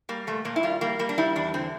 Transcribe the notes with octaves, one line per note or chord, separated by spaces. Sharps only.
G3 A#3
A#2 A3
A#2 A#3
E4
G3 F4
G3 A#3
G3 A#3
D4
G3 E4
E2 D4
D3 C4